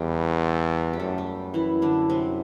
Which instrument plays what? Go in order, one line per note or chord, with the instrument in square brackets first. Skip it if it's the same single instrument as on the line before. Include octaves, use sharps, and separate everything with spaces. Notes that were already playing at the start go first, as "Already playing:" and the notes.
Already playing: [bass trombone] E2 [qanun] G3 G4
[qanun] G4
[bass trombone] F#2 [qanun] A3 A4
[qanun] G3 G4
E3 E4
D3 D4
C3 C4